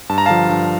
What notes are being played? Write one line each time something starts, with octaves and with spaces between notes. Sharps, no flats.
G2 A5
A#5
D3 F3 F5 A5
G2